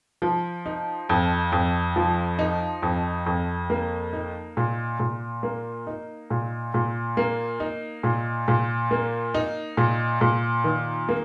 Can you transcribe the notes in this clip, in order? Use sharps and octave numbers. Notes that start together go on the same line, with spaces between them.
F3
D#4
F2
F2
F3
D#4
F2
F2
A#3
D#4
A#2
A#2
A#3
D#4
A#2
A#2
A#3
D#4
A#2
A#2
A#3
D#4
A#2
A#2
D#3
A#3